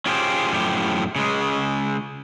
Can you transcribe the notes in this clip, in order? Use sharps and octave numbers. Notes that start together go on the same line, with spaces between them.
C#4 F4 G4 G#4 C5
F#2 A2 F3 G4
C#3 G#3